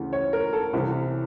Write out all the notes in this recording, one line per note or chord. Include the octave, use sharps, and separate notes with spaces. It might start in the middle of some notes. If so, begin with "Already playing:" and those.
Already playing: D2 C#3 E3
C#5
A#4
A4
C2 C3 E3